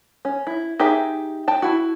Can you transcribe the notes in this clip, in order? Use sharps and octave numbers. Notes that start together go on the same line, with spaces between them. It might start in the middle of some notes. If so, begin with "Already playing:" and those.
C#4
E4
D#4 G4 G#4 E5 A#5
G5 A5
E4 F#4